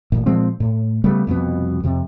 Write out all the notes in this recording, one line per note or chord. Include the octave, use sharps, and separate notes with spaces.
A1 A#2
A#2 F3 G#3 C4
A2
C#3 G3 A3 B3
C2 F2 B2 B3
F2 C3